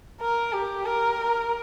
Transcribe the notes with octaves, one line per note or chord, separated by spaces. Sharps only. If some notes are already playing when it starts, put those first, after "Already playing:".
A#4
G4
A#4